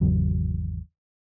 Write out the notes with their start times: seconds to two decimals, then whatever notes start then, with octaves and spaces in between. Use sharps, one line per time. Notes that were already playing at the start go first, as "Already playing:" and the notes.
0.01 G#1 E2 C#3 F#3